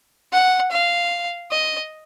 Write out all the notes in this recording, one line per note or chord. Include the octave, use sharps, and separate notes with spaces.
F#5
F5
D#5